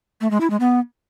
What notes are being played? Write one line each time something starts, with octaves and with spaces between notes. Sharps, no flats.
A3
G#3
E4
G#3
B3